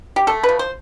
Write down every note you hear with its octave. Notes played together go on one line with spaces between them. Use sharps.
G4
A3 A4
B4
F3
C5